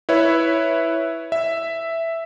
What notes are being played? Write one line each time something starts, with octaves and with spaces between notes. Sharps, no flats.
E4 B4 C#5 E5
E5